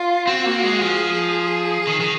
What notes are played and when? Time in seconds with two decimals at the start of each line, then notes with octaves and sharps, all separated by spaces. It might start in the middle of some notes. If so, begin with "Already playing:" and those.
Already playing: F4
0.27 C4 F#4
0.46 A#3
0.64 G#3
0.81 F3 G#4
1.87 D#3
2.01 D#3